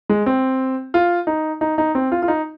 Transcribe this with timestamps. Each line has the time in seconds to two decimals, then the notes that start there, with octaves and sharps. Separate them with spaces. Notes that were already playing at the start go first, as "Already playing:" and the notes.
0.09 G#3
0.26 C4
0.94 F4
1.27 D#4
1.61 D#4
1.78 D#4
1.95 C4
2.12 F4
2.23 F4
2.28 D#4